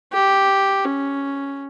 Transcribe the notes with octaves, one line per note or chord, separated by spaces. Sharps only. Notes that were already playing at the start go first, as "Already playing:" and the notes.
G4
C#4